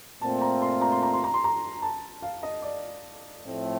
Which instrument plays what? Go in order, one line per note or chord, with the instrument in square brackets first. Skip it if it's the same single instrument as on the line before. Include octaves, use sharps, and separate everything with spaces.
[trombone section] A#2 A3 C4 F4 [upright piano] A5
[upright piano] A#5
C6
A#5
C6
A#5
C6
A#5
C6
A#5
A5
F5
D#5
D5
[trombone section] A2 F3 A3 C4